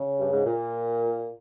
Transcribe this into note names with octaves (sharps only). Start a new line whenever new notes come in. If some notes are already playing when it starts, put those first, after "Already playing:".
Already playing: C#3
G2
G#2
A#2